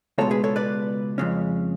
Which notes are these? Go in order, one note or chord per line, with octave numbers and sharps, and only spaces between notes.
C#2 B2 G#3 A4 C#5
G#4 B4
A4 C#5
B4 D5
F2 C#3 G#3 C#4